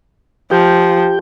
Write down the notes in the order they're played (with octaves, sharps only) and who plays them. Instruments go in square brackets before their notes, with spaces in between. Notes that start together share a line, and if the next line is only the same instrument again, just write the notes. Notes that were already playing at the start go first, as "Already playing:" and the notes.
[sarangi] F3 [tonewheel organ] G4 G5